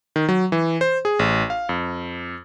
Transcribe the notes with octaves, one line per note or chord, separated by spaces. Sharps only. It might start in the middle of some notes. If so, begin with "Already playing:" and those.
D#3
F#3
E3
C5
G#4
A1
F5
F2